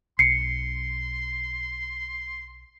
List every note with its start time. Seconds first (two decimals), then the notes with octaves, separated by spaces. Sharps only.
0.19 B1 C6 C7 C#7